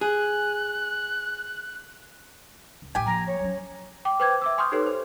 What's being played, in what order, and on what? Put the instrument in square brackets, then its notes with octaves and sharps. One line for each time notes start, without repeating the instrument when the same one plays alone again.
[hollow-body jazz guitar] G#4 [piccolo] F#6
[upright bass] C#2
[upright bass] A1 D2 [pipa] G4 G#5
[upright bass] F3 A#3 [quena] A#5
[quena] C#5
[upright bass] F#3 C#4
[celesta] G5 D6
B4 C5 G5 D6 G6 G#6
E5 D6 E6
G#5 C6 C#6 D#6 F6 G6
D#4 G4 A4 B4 C#5
C5